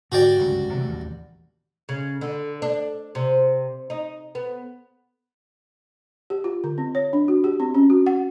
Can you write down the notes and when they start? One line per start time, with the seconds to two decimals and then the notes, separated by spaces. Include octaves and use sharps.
0.12 G#2 D3 F#4 G4 D5
0.39 G1 C#2 F#2
0.74 C3 E3 A3
0.89 A1 D#2
1.89 C#3
2.21 D3
2.62 D4
3.15 C3
3.90 D#4
4.35 B3
6.30 G4
6.44 F4
6.64 D3
6.78 C4
6.95 C#5
7.13 D4
7.28 F#4
7.44 G4
7.60 C4
7.75 C#4
7.90 F#4
8.06 F#5